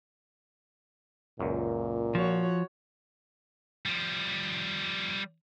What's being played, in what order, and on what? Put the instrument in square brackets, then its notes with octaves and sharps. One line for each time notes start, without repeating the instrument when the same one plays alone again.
[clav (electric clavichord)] C#2 F#2 [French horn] A#2
[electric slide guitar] F3 [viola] F#4 C#5
[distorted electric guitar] F3 G3